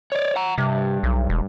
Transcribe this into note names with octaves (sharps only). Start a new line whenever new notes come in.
C#5 D5
F#5 A#5
G2 C3
B1
E1